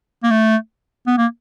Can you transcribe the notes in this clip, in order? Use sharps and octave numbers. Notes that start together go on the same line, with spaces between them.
A#3
A3
B3
A#3